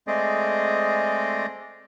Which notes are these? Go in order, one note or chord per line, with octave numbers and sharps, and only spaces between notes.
G#3 A3 C4 G#4 D5 D#5